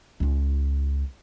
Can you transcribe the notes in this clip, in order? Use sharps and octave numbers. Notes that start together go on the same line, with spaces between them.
C#2 F4